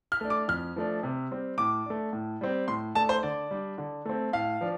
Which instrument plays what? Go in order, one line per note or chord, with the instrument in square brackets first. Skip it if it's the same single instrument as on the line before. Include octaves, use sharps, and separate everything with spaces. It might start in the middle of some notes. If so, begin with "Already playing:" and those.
[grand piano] F6
A3 D4
D6
F2 F6
F3 A3 D4
C3
G3 C4
A2 D6
A3 D4
A2
G3 C4
A2 C6
A3 D4 A5
C5
D3 D5
G3 D4
D3
A3 C4
A2 F5
F3 D4